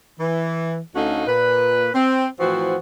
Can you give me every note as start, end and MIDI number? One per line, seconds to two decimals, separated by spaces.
0.20 0.77 52
0.96 1.24 38
0.96 1.24 57
0.96 1.24 61
0.96 1.24 63
0.96 1.24 66
0.96 1.24 77
1.27 1.89 46
1.27 1.89 71
1.94 2.27 60
2.40 2.76 45
2.40 2.76 52
2.40 2.76 53
2.40 2.76 60
2.40 2.76 66